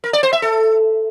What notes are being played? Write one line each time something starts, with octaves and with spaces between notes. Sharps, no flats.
A#4
D5
C5
E5
A4